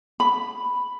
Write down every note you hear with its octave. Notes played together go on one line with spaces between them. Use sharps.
B5